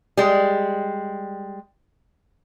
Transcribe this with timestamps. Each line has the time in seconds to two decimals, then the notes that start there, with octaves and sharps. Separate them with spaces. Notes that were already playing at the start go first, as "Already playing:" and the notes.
0.17 G3 G#3